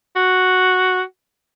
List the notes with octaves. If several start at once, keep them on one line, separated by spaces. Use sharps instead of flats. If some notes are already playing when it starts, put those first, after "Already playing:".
F#4